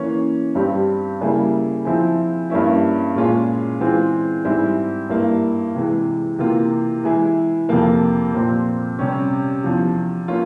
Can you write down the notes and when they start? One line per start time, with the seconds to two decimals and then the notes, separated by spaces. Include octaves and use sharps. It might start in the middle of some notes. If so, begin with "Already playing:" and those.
Already playing: E3 A#3 C#4
0.55 G2 G3 C4 G4
1.21 C#3 G3 A#3 E4 G#4
1.85 F3 C4 E4 G#4
2.50 G2 G3 A#3 C#4 E4
3.15 A#2 G#3 C#4 F4 G#4
3.79 E3 G#3 C4 F4 G#4
4.45 G#2 G3 C4 E4 G#4
5.10 G2 G3 A#3 E4
5.75 C3 E3 G#3
6.39 C3 E3 A#3 F4
7.04 E3 G#3 E4 G#4
7.69 F2 C3 F3 A#3
8.34 A#2 F3 C4
8.99 C3 G3 C#4
9.64 E2 C3 F3
10.28 A#3 C#4 F4